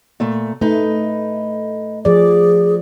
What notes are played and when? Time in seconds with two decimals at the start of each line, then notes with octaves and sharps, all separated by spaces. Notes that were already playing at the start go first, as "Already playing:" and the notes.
0.20 A#2 A3
0.61 A3 D#4 B4
2.05 F3 G#4 D5